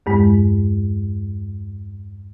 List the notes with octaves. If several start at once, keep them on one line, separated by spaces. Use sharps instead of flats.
E2 G2 G#3